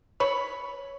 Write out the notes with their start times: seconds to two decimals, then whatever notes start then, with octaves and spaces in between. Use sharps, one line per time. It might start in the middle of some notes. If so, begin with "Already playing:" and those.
0.20 C#5 B5